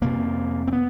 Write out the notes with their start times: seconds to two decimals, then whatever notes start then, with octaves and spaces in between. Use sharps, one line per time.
0.01 F2 C3 A#3
0.67 C4
0.73 B3